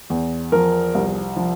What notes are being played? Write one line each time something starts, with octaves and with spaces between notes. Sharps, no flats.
E2
F3 A#4
C2
F3